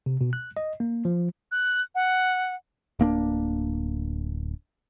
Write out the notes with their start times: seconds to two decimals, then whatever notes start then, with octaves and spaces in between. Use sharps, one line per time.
0.06 C3
0.21 B2
0.33 F#6
0.57 D#5
0.80 A#3
1.05 F3
1.52 F#6
1.95 F#5
2.99 D1 A#3 C4 D4